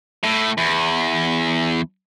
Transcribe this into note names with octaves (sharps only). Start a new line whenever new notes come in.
A2
E2